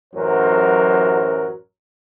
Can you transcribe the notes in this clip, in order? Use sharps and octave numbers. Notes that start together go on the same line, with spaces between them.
A1 F#2 F#3 A#4 C5